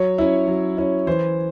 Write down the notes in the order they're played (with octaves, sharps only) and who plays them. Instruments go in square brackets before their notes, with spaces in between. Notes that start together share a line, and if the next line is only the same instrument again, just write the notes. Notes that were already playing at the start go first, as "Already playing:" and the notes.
Already playing: [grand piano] F#3 C#5
C#4 E4
F#3
C#4 E4
E3 C5